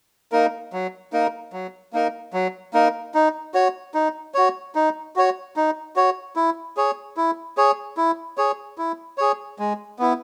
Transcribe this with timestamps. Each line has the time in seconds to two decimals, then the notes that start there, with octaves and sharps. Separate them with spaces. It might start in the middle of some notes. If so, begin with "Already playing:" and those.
0.32 A#3 D#4 A#4
0.73 F#3
1.13 A#3 D#4 A#4
1.53 F#3
1.93 A#3 D#4 A#4
2.33 F#3
2.74 A#3 D#4 A#4
3.14 D#4
3.54 F#4 C#5
3.94 D#4
4.34 F#4 C#5
4.75 D#4
5.16 F#4 C#5
5.56 D#4
5.96 F#4 C#5
6.36 E4
6.77 G#4 C#5
7.17 E4
7.57 G#4 C#5
7.97 E4
8.38 G#4 C#5
8.78 E4
9.18 G#4 C#5
9.59 G#3
9.99 B3 E4